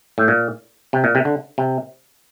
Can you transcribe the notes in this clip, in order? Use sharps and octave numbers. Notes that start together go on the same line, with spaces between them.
A2
A#2
C3
A#2
C3
D3
C3